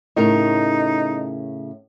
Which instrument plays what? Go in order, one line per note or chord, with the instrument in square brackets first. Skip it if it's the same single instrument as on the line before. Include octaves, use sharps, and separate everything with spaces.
[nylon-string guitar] A2 C#3 A#4 [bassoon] D#4